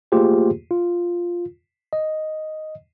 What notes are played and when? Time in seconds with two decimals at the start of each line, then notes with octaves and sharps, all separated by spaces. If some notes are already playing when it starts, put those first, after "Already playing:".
0.12 A3 A#3 F4 G4 G#4 C5
0.71 F4
1.93 D#5